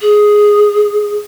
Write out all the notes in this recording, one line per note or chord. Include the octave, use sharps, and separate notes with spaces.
G#4